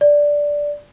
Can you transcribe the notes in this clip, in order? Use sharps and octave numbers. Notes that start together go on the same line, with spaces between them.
D5